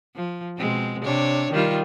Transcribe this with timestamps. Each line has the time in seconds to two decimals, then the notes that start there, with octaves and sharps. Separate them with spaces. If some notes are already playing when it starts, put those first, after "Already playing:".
0.15 F3
0.57 B2 G#3 C4
1.03 C3 D4 C#5
1.52 D#3 G3 F4